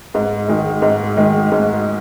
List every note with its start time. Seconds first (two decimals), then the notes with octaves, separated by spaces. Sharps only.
0.14 G#2
0.48 D#3 G#3
0.82 G#2
1.17 D#3 G#3
1.52 G#2